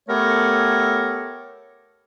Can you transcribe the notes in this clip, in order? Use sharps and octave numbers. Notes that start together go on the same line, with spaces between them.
A3 B3 G4 A4 A#4 C#5